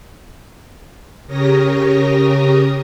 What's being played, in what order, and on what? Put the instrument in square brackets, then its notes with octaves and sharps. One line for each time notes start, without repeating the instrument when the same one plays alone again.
[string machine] C#3 G4 A#4 C#5 D#6 A#6